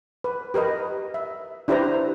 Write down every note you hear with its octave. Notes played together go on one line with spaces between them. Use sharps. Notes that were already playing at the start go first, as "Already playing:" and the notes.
B4
G4 A#4 B4 D#5
E5
D4 E4 G4 B4 C5 A#5